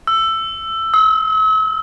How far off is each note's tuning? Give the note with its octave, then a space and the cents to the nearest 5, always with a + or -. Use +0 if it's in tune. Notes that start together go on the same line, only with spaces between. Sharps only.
E6 +10
E6 -40